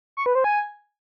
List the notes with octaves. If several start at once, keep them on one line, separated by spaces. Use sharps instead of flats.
C#6
B4
C5
G#5